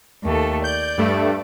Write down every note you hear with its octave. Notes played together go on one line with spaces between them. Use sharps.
D#2 A3 A4
D5 G6
G2 A3